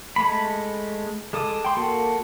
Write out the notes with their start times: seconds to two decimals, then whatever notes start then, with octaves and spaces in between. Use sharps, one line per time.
0.16 G#3 A3 B5
1.33 G#3 A4 D6 D#6
1.65 G5 C6
1.77 A#3 F#4 A4